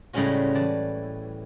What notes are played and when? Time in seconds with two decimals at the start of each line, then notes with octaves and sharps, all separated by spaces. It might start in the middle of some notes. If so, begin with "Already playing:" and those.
0.13 A2 C#3 G3 G#3 C#4 F#4
0.55 E3 D5 A5